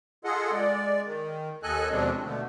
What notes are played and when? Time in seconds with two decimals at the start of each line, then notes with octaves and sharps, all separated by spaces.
0.24 F4 G#4 A4 D#5 F#5
0.52 G#3 D5
1.06 D#3
1.63 D#2 A4 D#5 G#5 F#6
1.91 D#2 B2 F3 G#3 C4 D4
2.23 B2 D3 A3